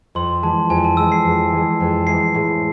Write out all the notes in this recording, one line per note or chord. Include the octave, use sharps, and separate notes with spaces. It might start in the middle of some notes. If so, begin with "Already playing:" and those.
F2 C6
E3 G#3 A5
F2 G#5
A5
E3 G#3 E6
C7
F2
E3 G#3
F2
E3 G#3 C7
A2